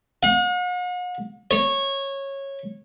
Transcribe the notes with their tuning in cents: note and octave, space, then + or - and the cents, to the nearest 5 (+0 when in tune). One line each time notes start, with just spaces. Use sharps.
F#5 -45
C#5 -15